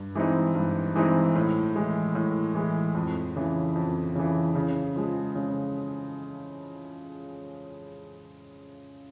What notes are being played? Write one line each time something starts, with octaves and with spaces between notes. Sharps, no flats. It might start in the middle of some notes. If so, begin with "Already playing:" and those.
Already playing: G2
E3 G#3 C4 D#4
G2
E3 G#3 C4 D#4
A2
E3 G#3
A2
E3 G#3
F2
C#3 E3
F2
C#3 E3
C#3
F3 G#3
C#3